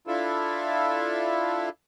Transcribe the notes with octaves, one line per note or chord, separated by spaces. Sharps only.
D4 E4 F4 A4 E5